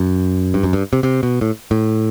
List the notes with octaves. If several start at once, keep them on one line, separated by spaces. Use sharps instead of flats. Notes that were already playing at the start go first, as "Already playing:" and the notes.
Already playing: F#2
G2
F#2
G2
C3
C3
B2
A2
A2